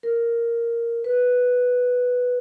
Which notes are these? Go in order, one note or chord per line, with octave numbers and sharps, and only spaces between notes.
A#4
B4